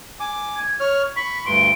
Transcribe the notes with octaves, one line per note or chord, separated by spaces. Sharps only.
G#5 D6
G#6
C#5 C#6 F6
B5 C#6 B6
D2 G2 C6 D7